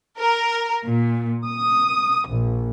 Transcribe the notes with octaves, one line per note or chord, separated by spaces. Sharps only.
A#4
A#2
D#6
A#1